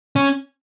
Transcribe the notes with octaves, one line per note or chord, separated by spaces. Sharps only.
C#4